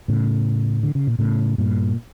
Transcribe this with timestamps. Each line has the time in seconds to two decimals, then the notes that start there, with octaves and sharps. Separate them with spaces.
0.08 A2 C#3
0.83 D3
0.95 C#3
1.07 A#2
1.19 A2 C#3
1.58 G2 A#2